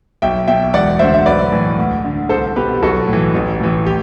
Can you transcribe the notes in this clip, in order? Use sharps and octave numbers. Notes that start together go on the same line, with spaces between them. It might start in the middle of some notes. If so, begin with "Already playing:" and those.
B1 E5 G5
B2 E5 G5
E1 D5 F#5
D2 D3 C5 E5
E5
B1 B4 D5
A2 E3
D2
D3
C2 A4 C5
B2 G4 B4
B1 F#4 A4
A2
E3
A1
A2 E3
G4